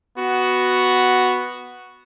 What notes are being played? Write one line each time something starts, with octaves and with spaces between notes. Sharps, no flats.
B3 F#4